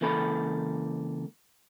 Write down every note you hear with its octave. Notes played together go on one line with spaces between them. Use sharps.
C#2 E3 A#3 A4 B5